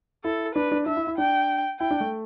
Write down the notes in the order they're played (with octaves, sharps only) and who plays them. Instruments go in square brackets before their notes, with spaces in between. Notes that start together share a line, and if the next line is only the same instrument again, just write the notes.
[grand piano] E4 [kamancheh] A4
[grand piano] D4 [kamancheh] B4
[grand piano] D4
[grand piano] D4 [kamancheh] E5
[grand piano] E4
E4
[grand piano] D4 [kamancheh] G5
[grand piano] E4 [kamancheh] G5
[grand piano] D4
A3